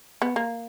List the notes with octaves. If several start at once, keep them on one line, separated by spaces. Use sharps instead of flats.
B3
A#3